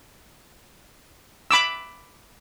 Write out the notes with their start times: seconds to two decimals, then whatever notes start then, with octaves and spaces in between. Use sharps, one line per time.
1.51 B5 D6 E6